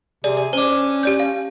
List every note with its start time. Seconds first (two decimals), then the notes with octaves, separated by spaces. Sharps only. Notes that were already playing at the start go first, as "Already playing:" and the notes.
0.24 C3 G#4 D5
0.37 G#4
0.53 C#4 D4 C5 G#5
1.03 G4 D5 G6
1.20 F5